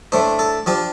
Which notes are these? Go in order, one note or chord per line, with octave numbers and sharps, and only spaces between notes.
A2 A3 D4 C5
A4
F3 D4 F4 G4